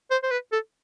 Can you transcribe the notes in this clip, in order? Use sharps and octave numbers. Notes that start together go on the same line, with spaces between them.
C5
C5
B4
A4